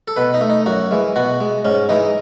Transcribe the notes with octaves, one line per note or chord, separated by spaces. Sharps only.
A4
B2 B4
D#4
A3
D#4
F#2 F#4
E3 G#3
B2 F#4
G#3
G#2 C#4
E3 G#3 D#4